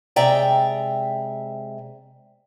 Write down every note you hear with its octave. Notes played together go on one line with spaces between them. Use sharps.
C3 G#3 D5 E5 G5 A#5